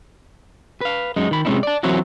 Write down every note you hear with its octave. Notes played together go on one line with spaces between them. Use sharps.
B4 F5
F#2 G#3 D#4
D#3 B5
C3 G#3 C4 C#4 D#4 E4
D5 A5
E3 F#3 C4 C#4 E4 F#4